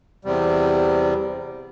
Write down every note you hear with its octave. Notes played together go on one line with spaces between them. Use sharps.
E2 C3 G3